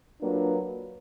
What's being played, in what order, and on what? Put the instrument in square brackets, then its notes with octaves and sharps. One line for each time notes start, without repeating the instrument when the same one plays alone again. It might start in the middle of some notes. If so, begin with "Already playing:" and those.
[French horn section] F#3 A#3 D4 F4 B4